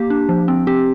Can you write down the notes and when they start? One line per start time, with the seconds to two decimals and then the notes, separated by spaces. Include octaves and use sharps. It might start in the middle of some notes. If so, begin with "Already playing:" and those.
Already playing: A#3 G4
0.10 D4
0.29 F3
0.48 C4
0.67 C4 G4